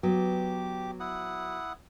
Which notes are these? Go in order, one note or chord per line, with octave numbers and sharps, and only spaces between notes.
F#3 B3 G4 D6
E4 F#5 D#6